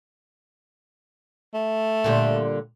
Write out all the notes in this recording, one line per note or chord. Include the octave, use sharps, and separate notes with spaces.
A3
A#2 D3 G3